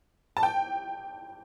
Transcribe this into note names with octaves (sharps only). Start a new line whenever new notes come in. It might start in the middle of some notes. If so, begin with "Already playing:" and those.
A5
G5